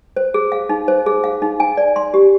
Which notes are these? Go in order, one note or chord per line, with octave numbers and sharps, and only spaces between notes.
C5
G#4
F5
D#4
C5
G#4
F5
D#4
G#5
D5
C6
G4